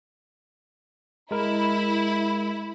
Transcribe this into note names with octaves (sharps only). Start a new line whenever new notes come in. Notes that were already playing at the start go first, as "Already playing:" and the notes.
G#3 E4 A#4